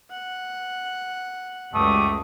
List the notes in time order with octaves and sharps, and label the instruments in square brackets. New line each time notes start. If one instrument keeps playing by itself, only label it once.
[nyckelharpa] F#5
[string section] C#2 F#2 [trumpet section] G3 D6 D#6 [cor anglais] A3